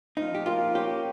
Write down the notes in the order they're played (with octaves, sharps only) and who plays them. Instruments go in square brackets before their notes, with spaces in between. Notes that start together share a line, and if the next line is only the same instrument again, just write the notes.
[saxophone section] F3 [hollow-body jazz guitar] D#4
[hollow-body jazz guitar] G4
[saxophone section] A#3 [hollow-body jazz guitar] F4
[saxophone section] C#4 [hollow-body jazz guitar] G4